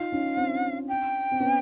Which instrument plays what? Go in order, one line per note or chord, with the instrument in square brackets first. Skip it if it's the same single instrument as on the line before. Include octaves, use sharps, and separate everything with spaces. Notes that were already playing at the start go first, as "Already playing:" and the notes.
Already playing: [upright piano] D#4 F4 [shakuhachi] F5
[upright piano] C#4 D#4
C4 D4
[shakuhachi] G5
[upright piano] C4
B3 C#4